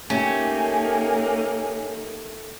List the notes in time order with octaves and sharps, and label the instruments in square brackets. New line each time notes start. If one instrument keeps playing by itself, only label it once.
[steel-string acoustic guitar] A3 G4 [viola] A#3 D#4 [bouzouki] C#4 [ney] G#5